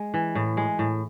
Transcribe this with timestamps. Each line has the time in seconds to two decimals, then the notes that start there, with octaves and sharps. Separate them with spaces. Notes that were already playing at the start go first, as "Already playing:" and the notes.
Already playing: G#3
0.14 E3
0.35 A2
0.57 G#3
0.79 A2